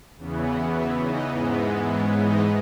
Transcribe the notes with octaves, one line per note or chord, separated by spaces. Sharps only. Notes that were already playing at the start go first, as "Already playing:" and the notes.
E2 C#3 E3 B3
F#4 F#5
E4 E5
D#4 D#5
G#2 E3 G#3 B3
B4
C#4 C#5
D#4 D#5